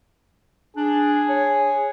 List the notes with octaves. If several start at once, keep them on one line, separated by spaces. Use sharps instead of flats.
D4 G#4
C#5